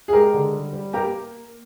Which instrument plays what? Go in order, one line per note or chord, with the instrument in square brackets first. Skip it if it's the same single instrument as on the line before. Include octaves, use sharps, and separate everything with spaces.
[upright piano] G#4
[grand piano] G#3 [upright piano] G4 A#4
[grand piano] D3
G3
G3
[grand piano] A#3 [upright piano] G4 A#4